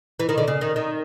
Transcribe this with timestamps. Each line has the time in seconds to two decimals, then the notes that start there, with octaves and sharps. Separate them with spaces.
0.20 E3
0.29 D#3
0.38 D3
0.48 C#3
0.61 D#3
0.76 D#3